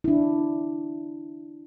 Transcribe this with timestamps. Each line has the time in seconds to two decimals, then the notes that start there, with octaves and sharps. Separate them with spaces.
0.04 D4 E4